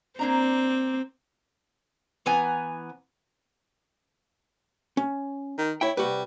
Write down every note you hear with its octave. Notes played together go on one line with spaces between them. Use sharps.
A#3 C4 D4 A#5
E3 B3 G#5 A#5
C#4
D#3
E4 C#5 G5
C2 G3 F#4 B4